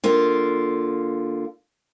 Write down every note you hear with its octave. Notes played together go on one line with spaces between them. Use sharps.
D3 A#3 F4